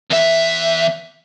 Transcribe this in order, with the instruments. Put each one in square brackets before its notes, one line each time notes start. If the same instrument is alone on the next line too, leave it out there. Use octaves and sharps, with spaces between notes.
[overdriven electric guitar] E2 E5